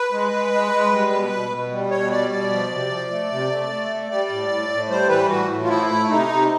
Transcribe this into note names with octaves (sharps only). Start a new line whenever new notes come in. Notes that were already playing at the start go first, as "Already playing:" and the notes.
Already playing: B4
G#3
G#3
G#3
G#3
G3
B2
B2
B2
G3
B2 C#5
G3 D5
B2 D5
F3
C3
F3
A3
C3
A3
A3
A3
G3 D5
A2
A2
A2
G3 C5
E3 B4
A2 F#4
A2
F4
F3 E4
A3
C3 D#4
C3